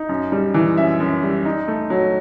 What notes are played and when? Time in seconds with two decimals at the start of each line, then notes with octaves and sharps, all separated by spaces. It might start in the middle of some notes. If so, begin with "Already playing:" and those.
Already playing: D#4
0.09 F#2
0.32 G3
0.54 E3
0.77 F#2 E5
1.00 F#2
1.23 G3
1.45 D#4
1.68 A3
1.90 F#3